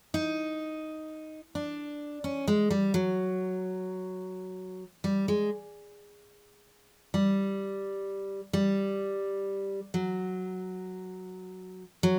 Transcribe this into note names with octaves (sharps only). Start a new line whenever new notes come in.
D#4
D4
C#4
G#3
G3
F#3
G3
G#3
G3
G3
F#3
F#3